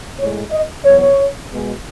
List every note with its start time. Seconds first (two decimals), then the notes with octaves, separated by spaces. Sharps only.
0.19 A2 G#3 C#5
0.51 D#5
0.84 E2 B2 F#3 C#5
1.50 B2 G#3